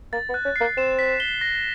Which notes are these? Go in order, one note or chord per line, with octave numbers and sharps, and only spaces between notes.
A#3 A6
B3
F#6
C#4
A#3 C7
C4 E7
B6
G7
A#6